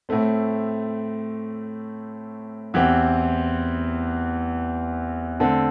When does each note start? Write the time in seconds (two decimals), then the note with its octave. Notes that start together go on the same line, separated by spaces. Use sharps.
0.09 A2 A3 C4
2.74 E2 E3 C4 G4
5.40 D3 A3 C4 A4